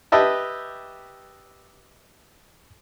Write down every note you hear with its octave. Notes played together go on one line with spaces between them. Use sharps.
G4 B4 D#5 E5 A5